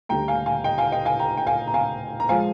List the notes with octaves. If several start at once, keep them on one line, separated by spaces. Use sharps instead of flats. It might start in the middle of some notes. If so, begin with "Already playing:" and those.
D2 D3 G3 G5 A#5
F5 G#5
F5 G#5
D#5 G5
F5 G#5
D#5 G5
F5 G#5
G5 A#5
G5
F5 G#5
A#5
F5 G#5
A#5
F3 G#3 F5 G#5